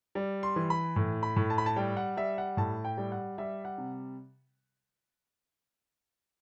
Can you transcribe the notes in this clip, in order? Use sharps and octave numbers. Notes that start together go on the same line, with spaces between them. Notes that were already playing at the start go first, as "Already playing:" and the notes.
G3
C6
E3
B5
A2
B5
A2
A5
B5
A5
G3 G5
F#5
G3 E5
F#5
A2 A5
G5
G3
F#5
G3 E5
F#5
C3